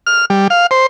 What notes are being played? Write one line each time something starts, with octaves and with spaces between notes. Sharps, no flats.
F6
G3
F5
C5